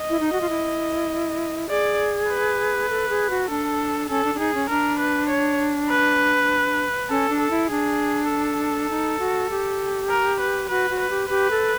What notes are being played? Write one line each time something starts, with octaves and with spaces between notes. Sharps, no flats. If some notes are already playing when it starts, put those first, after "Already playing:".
Already playing: D#5
E4
D#4
F#4
F4
E4
G#4 D5
B4
A4
G#4
F#4
D4 A4
C#4 A4
D4
D4
D#4 G#4
C#4
D4 A#4
B4
C#5
B4
C#4 A4
D4
A4
E4
D4 G#4
A4
D#4
F#4
G4
A#4
B4
F#4 B4
F#4
B4
G4
G4 B4
A4